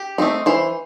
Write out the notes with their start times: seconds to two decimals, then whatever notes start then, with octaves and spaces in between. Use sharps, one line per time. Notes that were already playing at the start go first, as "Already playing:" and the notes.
Already playing: G4
0.18 A3 C4 D#4
0.46 E3 C5